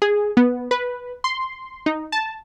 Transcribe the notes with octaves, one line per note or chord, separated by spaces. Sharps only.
G#4
B3
B4
C6
D#4
A5